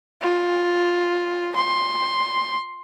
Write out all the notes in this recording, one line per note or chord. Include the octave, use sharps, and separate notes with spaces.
F4
C6